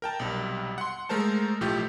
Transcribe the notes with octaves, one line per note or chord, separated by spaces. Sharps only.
A#4 G5 A5
B1 C3 G3
F#5 C6
G#3 A3 A#4 C5 A5
B1 A2 F3 A3 G4 G6